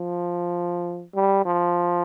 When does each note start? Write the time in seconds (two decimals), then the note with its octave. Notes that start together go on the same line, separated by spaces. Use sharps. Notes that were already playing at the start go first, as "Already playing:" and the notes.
Already playing: F3
1.15 G3
1.46 F3